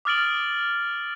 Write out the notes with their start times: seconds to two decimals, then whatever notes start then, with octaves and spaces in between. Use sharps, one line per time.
0.05 D6 D#6 F6 A6 D7 F#7